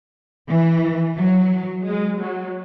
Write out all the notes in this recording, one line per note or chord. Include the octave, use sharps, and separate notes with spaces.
E3
F#3
G#3
F#3